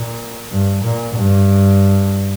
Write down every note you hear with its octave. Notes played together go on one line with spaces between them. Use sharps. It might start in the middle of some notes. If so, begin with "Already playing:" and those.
Already playing: A#2
G2
A#2
G2